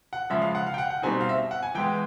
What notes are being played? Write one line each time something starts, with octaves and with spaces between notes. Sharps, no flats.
F#5
C#3 F3 G#3 E5
F5
F#5
F5
G5
F#5
F#5
B2 G3 C4 D#4 G#5
F5
E5
F#5
G#5
E3 G#3 B3 G5